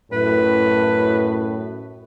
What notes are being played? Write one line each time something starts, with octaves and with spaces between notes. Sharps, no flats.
F#2 A2 B4